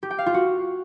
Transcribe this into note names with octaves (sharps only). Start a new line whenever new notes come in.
G4
G5
F5
F4
F#4